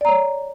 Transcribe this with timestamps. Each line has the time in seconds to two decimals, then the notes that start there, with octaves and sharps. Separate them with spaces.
0.01 D5
0.05 A#5
0.09 C#5